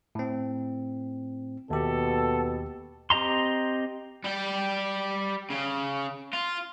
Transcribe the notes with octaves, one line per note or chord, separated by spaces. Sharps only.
A2 C4
D#2 B2 G4 A4
C4 G4 D#5 A#5 C6
G3 G4
C#3
F4